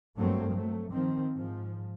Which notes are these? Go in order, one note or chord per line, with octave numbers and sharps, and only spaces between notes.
G2 F#3 A3 A#3 C4
F#3 A3
D#3 F3 C4
G#2 F3